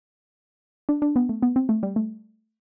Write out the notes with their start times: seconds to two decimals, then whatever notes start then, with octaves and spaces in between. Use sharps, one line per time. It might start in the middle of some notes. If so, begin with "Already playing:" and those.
0.89 D4
1.02 D4
1.16 B3
1.29 A3
1.43 B3
1.56 C4
1.69 A3
1.83 G3
1.96 A3